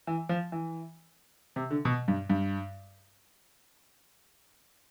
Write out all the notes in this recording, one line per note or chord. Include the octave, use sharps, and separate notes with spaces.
E3
F3
E3
C3
D3
B2
G2
G2